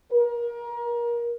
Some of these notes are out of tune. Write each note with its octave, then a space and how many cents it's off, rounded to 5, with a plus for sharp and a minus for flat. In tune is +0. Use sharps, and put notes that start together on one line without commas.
A#4 +30